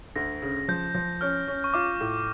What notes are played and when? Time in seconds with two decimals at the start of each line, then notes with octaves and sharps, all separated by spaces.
0.16 D2 A#6
0.42 C#3
0.68 F3 G6
0.95 F3
1.21 C#4 F6
1.48 C#4
1.64 C#6
1.74 F4 D6
2.01 A2